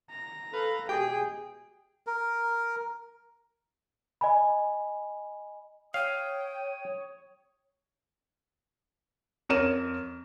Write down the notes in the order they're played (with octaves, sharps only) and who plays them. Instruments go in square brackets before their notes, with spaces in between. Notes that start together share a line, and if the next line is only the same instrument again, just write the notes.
[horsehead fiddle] A#5
[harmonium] A4 F5 [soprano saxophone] B4
[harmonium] B2 G#3 [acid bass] G4 [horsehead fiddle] G#4 [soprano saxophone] G5
[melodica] A#4
[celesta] D#5 G#5 B5
[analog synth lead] C#5 [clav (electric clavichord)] F5 [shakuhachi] G5 [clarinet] D#6
[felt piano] F2 A#4 C#5 D#7 E7